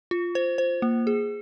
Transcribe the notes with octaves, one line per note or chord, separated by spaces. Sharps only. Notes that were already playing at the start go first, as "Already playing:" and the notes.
F4
C5
C5
A#3
G#4